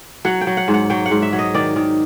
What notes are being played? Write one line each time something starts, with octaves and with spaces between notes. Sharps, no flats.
F#3 F#5
G5
F#3
F#5
G#2
F#5
F#3 G5
F#5
G#2
E5
F#3
D#5
D#3 D5
D#3